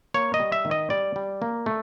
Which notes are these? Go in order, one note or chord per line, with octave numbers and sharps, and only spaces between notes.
A#3 C#5
D#5
G3
E5
D#3
D#5
G3 D5
G3
A#3
A3